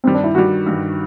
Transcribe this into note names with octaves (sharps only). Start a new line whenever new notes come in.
G2 D#3 G3 C4
D4
E4
G2 D#3 G3 F#4
G2 D#3 G3